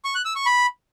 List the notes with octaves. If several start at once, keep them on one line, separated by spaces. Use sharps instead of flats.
C#6
F#6
E6
C#6
B5